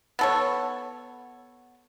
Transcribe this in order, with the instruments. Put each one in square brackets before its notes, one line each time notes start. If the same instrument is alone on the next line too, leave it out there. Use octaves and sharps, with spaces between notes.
[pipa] B3 A4 C#5